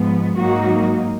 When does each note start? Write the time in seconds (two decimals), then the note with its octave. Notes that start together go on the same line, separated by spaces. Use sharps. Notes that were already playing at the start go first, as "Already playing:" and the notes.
Already playing: G#2 F3 G#3 B3
0.37 G#2 F#3 A#3 D#4 F#4